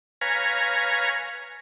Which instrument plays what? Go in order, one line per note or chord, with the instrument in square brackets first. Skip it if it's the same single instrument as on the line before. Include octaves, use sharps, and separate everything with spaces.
[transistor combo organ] B4 C#5 F5 G#5 A#5